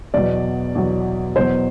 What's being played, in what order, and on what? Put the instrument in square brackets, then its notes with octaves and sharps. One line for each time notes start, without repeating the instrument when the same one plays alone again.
[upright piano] E2 B2 F#3 D5
E2 B2 F#3
E2 B2 F#3 C5